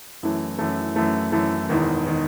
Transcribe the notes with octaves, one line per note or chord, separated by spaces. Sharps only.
F#2 E3 A3
F#2 E3 A3
F#2 E3 A3
F#2 E3 A3
E1 E2 D#3
D#3